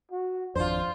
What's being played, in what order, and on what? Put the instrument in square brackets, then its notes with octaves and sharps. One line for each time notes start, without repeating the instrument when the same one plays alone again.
[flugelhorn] F#4
[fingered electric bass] G#1 F2 [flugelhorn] D4 [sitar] F4 C5